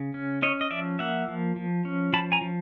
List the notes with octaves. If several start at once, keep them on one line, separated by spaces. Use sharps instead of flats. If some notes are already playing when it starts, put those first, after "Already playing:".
Already playing: C#3
C#4
C#4 C#5 D#5
D#5
F3 D5 E5
A#3 E5 F#5
F3
F3
C#4
F3 A5 B5
G#5 A#5
F3